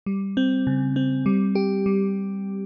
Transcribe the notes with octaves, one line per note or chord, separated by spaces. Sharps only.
G3
C4
C#3
C4
G3
G4
G3